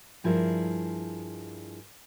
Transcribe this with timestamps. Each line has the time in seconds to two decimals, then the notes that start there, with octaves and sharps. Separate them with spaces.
0.24 G2 F3 E4 G#4 A#4